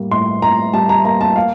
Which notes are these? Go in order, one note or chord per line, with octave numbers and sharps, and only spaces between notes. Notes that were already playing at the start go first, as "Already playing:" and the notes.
Already playing: A2 G3 A#3
A2 C6
A2 A#5
G3 A5
A#5
A#3 A#5
A5
F5